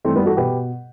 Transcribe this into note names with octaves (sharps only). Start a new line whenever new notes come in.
G2 E3 A3 C4
G3 B3
F#4 A4
B2 G4 B4